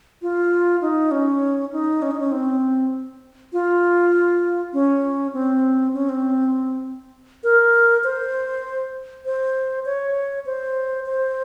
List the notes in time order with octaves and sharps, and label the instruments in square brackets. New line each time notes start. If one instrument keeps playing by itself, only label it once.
[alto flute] F4
D#4
C#4
D#4
C#4
D#4
C#4
C4
F4
C#4
C4
C#4
C4
A#4
C5
C5
C#5
C5
C5